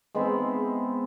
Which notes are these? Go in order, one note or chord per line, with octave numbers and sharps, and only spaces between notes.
G#3 B3 C4 E5